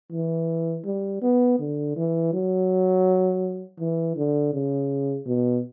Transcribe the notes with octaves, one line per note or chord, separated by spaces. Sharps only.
E3
G3
B3
D3
E3
F#3
E3
D3
C#3
B2